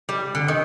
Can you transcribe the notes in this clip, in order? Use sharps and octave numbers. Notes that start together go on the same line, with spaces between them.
G3
D3
D#3